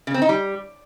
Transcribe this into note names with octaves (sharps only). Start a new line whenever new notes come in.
C#3
C4
D#4
G3